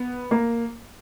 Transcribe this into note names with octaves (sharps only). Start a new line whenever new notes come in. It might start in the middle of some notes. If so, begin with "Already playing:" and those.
Already playing: B3
A#3